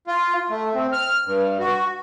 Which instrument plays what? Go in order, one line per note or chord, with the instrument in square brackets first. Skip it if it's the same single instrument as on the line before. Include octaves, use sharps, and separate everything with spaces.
[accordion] F4
A3
C4
F6
G2
F#4